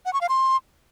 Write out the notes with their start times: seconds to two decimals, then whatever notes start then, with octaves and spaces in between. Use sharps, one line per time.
0.06 F#5
0.13 C#6
0.21 F5
0.29 C6